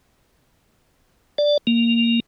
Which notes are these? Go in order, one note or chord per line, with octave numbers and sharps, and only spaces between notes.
D5
A#3